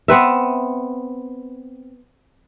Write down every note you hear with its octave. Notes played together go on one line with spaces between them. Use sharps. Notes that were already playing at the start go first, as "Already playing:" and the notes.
B3 C4 B4 E5